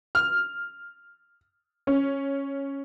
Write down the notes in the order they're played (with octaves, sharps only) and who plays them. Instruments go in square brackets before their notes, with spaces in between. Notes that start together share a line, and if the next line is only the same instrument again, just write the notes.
[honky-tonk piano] F6
C#4